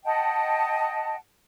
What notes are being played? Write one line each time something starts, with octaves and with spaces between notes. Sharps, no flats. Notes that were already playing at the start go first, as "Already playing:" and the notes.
D#5 F#5 G5 A5